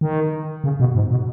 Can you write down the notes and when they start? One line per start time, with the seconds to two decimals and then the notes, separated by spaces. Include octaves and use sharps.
0.01 D#3
0.64 C#3
0.80 B2
0.95 G#2
1.11 B2